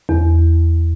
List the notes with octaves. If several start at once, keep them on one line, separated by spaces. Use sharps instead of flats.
E2